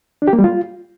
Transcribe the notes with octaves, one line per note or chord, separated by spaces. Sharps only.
D4
G4
A#3
G3
F4